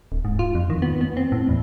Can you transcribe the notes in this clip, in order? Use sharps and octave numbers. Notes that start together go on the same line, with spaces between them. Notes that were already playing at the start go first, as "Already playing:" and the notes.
D1
G#2
F4
F2
D#3
B3
B3
C4
A2
E2